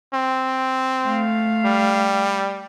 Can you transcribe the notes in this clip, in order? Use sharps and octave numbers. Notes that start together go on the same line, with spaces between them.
C4
A3 F5
G3